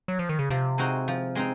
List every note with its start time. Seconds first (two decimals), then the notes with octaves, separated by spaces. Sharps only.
0.08 F#3
0.19 F3
0.29 D#3
0.39 C#3
0.50 C3 F3
0.78 G#3 C4 D#4 F#4
1.08 F3
1.35 G#3 C4 D#4